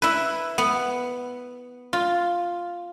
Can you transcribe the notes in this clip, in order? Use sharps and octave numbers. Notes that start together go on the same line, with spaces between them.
E4 B4
B3
F4